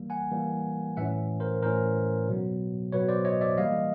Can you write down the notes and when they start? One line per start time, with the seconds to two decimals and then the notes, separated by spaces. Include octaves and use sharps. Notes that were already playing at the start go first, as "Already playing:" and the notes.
Already playing: E3 G3 A#3
0.10 F#5 G#5
0.31 E3 G3 A#3
0.97 A2 E3 A3 C#4 E5 F#5
1.40 A#4 C5
1.62 A2 E3 A3 C#4 A#4 C5
2.28 B2 F#3 B3
2.92 B2 F#3 B3 B4 C#5
3.08 C5 D5
3.25 C#5 D#5
3.41 D5 E5
3.57 E3 G3 A#3 D#5 F5